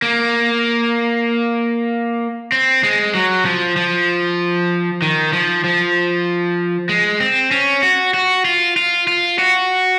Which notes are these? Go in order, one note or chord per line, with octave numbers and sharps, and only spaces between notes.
A#3
C4
G#3
F#3
F3
F3
D#3
F3
F3
G#3
C4
C#4
F#4
F#4
F4
F4
F4
F#4